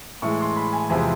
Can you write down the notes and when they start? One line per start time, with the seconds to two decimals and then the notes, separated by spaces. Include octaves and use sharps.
0.22 A2 E3 G#3 C#6
0.40 C6
0.56 B5
0.73 G#5
0.89 E2 C3 F3 G#3 G#5